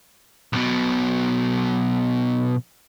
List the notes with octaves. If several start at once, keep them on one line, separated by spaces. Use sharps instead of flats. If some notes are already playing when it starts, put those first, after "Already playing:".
B1 B2